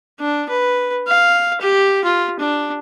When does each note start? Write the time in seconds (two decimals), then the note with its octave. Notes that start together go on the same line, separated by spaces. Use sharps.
0.19 D4
0.49 B4
1.07 F5
1.61 G4
2.04 F4
2.39 D4